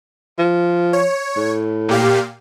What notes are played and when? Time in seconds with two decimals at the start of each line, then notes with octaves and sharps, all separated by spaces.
0.38 F3
0.93 C#5
1.37 A2
1.89 A#2 G4 F5